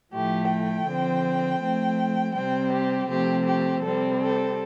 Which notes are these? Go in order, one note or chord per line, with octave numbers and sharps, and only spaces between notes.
A2 F3 A3 G4
G5
D3 F3 C4
F3 A3 C4
C3 G3 C4 G5
G4
C3 F3 A3 C4 G4
G4
C3 G3 C4 A4
A4